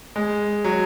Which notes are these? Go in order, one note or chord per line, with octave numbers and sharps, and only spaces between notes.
G#3
F#3